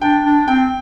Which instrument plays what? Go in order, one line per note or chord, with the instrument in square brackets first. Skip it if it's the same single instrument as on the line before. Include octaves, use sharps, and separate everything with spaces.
[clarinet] D4 [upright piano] G5
[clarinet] D4
[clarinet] C4 [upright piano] G5